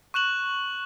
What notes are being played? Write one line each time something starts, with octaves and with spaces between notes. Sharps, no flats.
C#6 F#6 E7 F#7